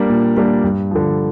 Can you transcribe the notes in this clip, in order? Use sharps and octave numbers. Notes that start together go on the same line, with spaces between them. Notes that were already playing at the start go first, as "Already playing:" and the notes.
Already playing: G3 A#3 D4
A#2
G3 A#3 D4
G2
D3 F3